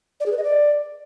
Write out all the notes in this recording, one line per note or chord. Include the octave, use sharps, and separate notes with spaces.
D5
G#4
B4
D#5
D5